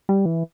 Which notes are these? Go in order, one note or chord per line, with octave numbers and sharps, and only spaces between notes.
G3
E3